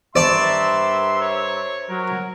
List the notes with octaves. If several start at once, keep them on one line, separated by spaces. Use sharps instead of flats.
G2 A#4 C5 D5 E5 A5 C6 C#6
C#5
F#3 A#4